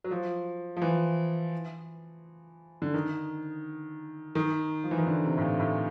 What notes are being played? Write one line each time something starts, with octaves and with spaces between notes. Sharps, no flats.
F#3
F3
F3
E3
D3
D#3
D#3
F3
E3
D#3
D3
C3
A2
A#2
A2